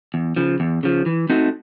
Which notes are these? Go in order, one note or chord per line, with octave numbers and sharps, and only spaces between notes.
E2
C#3 F3
E2
C#3 F3
E3
A3 C4 D#4 F#4